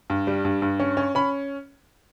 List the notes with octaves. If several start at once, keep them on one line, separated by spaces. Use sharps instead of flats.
G2
G3
G2
G2
C#4
C#4
C#4 B5